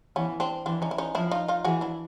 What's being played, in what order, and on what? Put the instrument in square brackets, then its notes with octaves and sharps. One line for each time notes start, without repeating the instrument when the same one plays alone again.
[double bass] E3 [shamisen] B3 C#4
[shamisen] C4 D4
[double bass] E3 [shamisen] C4 D4
[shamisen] C#4 D#4
E4
C#4 D#4
[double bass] F3 [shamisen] D4 E4
[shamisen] D#4 F4
D#4 F4
[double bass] E3 [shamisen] F#4 G#4
[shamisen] D4 E4